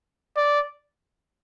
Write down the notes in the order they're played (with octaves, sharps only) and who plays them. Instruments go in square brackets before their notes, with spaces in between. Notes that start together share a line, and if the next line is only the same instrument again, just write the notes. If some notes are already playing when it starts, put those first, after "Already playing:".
[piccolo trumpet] D5